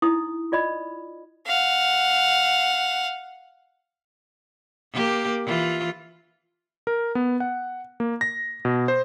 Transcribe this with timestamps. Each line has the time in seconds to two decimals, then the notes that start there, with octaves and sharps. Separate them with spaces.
0.02 D#4 E4 D#6
0.52 F4 D5 D#5 B5
1.47 F5 F#5
4.92 A#3 G4
5.45 E3 F4
6.87 A#4
7.15 B3
7.40 F#5
8.00 A#3
8.21 A#6
8.65 B2
8.88 C5